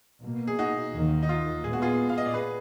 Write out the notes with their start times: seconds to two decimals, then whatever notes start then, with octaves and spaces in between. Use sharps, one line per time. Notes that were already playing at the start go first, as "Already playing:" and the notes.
0.23 B2 A#3
0.47 G#4
0.59 D#4 F#4
0.93 D#2 D#3 A#3
1.23 D#4
1.29 F4
1.64 A#2 G#3 B3 G#4
1.73 F#4
1.82 F4 G#4
2.09 F5
2.18 D#5
2.26 D5
2.34 G#4 B4